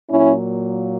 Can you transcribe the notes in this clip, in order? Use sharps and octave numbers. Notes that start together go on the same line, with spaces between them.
A#2 F#3 A#3 C#4 E4